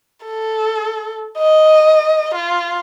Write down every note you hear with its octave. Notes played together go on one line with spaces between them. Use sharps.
A4
D#5
F4